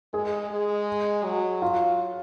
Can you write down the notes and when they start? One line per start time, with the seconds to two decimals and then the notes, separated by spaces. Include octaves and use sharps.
0.13 G#3 G#4
0.50 G#3
1.25 F#3
1.62 F4